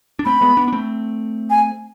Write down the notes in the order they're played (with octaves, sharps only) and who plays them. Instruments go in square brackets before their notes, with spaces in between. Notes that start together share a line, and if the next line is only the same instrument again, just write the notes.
[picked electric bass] D4
[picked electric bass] A3 C4 [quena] B5
[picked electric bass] G#3 B3
B3 D4
D4
A3 C4
[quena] G#5